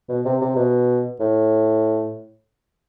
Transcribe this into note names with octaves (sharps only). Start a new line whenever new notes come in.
B2
C3
C3
B2
A2